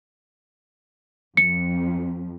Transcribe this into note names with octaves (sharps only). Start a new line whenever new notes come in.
F2 C#7